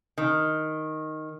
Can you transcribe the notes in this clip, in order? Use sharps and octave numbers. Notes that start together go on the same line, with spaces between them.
D#3